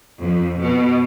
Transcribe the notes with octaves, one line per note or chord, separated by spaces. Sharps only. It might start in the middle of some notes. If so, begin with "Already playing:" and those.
F2
B2